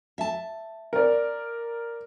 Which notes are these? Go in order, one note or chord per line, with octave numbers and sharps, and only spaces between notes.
E5 A5
A#4 D5